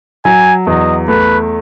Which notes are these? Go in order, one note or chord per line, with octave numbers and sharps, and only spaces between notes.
F#3 G#5
E2 D#5
A3 B4